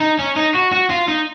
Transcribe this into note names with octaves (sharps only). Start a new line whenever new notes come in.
D#4
C#4
D#4
F#4
F#4
F4
D#4